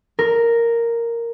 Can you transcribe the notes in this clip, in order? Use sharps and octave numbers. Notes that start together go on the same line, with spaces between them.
A#4